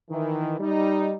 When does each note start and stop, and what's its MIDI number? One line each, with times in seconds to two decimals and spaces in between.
0.10 0.55 51
0.10 0.55 52
0.60 1.16 55
0.60 1.16 63